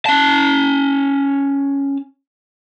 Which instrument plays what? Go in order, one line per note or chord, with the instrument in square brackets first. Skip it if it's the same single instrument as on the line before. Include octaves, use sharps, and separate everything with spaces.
[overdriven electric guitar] C#4 A5